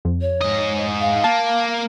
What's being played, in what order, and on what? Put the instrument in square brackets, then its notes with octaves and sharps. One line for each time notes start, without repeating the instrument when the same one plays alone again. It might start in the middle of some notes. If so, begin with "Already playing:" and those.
[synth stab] F2
[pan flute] C#5
[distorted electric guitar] G#2 D#5
[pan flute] F5
[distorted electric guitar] A#3 [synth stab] A5